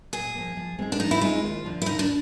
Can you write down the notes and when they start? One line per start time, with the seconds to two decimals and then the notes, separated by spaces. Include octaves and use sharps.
0.13 A#2 G#4
0.35 F3 A#3
0.57 F3
0.78 G#3 C4 D#4 G#4
0.92 D4
0.99 F3 D#4
1.11 E4
1.21 G#3 C4 D#4 F4 G#4
1.44 D#2
1.65 D3 F3
1.82 E4
1.86 D#2 D#4
1.99 D4